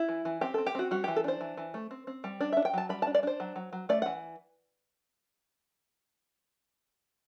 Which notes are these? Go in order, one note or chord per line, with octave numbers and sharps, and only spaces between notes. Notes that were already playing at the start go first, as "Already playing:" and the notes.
Already playing: E4
E3
E3
C4 G4
C4 A4
G4
C4 F#4
G3 F#4
E3 G4
A4
D4 C5
E3
E3
A3
C4
C4
G3
D4 D5
D4 E5
G5
F#3 A5
G3 B5
D4 A5
D5
D4 C5
F#3
F#3
F#3
A3 D5
E3 F#5